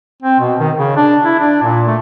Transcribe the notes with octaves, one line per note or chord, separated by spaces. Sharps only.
C4
B2
D#3
C#3
D4
E4
D4
A#2
A3